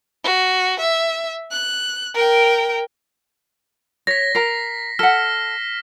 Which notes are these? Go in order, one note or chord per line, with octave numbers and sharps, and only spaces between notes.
F#4
E5
F#6
A#4 G5
C#5 A#6 B6
A#4 A#5 C7
A4 F#5 F6 B6 E7